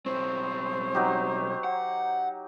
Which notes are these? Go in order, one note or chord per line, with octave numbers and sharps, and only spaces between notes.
B1 C4 C5 C#5
F#3 D#4 G4
F#5